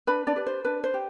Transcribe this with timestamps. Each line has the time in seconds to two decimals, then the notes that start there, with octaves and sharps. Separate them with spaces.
0.07 D4 B4 B5
0.27 D4 D5
0.36 G4 B4
0.47 C5
0.65 D4 B4
0.84 C5
0.94 G4